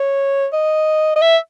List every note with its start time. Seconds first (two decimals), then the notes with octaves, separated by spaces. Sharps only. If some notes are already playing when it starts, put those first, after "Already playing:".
Already playing: C#5
0.53 D#5
1.16 D#5
1.22 E5